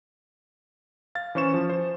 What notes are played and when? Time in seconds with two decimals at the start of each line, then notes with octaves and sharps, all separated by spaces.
1.15 F5 A6
1.35 E3 C#4 C5 C#6 E7
1.54 F3
1.70 C5